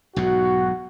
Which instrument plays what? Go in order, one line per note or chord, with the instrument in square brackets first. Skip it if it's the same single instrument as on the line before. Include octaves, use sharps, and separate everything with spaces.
[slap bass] B1 G#2 B2 [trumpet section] F#4